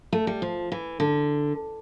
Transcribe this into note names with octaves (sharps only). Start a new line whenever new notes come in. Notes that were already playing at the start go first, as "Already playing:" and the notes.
A3
G3
F3
E3
D3